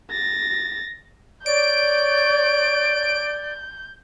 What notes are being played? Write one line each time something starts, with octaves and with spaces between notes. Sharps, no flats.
A6 A#6
C#5 D5 G6 D7